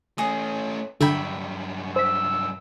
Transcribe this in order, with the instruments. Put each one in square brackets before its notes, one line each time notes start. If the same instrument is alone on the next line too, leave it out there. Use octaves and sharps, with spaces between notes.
[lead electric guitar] A3 C#4 [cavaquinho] G#4 D#5
[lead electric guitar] G2 F#3 [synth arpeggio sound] D3 [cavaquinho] E5 G5 B5
[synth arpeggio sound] C5 B6 [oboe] E6